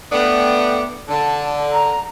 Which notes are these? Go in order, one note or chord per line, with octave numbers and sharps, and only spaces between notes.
A3 B3 D4 G5
D3 A5
A#5